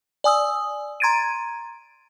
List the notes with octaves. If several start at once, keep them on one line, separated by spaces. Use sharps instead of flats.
D5 G#5 D#6 E6
A#5 C6 G#6 A6 D7 D#7